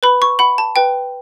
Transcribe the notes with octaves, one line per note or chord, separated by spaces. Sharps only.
B4 B5
C#6
F#5 B5
A5
B4 G5